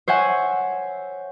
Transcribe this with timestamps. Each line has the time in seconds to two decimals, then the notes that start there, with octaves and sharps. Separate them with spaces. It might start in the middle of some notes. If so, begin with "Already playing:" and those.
0.08 C5 C#5 E5 F#5 G#5